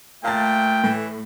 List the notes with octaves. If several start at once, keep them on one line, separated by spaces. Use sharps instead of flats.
A#2 A3 F5 G5 A5 A6
A2 E3